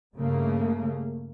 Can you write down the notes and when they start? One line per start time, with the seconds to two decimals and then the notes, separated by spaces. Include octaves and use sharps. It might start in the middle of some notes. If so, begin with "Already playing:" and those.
0.14 G2 C#3 A3 A#3